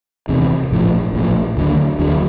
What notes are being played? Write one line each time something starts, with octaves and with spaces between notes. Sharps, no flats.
E2 C3 D#3
A#1 A2 F3
A#1 A2 F3
D#2 D3 F#3
D#2 D3 F#3